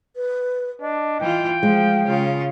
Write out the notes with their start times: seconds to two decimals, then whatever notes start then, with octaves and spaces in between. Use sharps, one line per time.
0.16 B4
0.81 D4 D#5
1.21 E3 F4 G5
1.63 F3 G#3 F5
2.07 C#3 F4